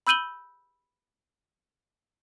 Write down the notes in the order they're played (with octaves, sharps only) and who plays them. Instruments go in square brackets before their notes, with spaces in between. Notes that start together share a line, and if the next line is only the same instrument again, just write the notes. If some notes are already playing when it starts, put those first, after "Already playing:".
[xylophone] B5 E6 G6 D#7 F#7 G7